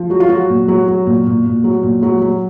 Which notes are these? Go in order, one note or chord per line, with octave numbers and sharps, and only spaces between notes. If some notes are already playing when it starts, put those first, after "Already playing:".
Already playing: F3
F#3 F#4
F4
F#3 F#4
A#2
F#3
F#3
A#2
A#2
A#2
F#3
A#2
F#3
F#3